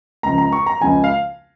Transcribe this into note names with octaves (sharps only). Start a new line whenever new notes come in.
C#2 C#3 F3 A#5
A#5
C#6
A#5
C#2 C#3 F3 G#5
F5